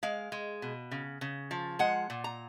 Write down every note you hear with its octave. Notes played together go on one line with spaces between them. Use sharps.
G#3 F5
G#3
B2
C#3
C#3
F3
G#3 F#5
A#2
A#5